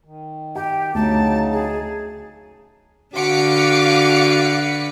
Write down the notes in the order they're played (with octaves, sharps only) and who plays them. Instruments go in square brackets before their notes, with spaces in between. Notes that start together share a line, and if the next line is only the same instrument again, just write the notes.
[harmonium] D#3
[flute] G4 [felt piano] G5
[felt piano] D2 [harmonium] C#3 F#3 D#4 [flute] A5
[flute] G#4
[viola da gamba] D3 B4 [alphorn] F#4 [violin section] F5 D6 [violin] B6 C#7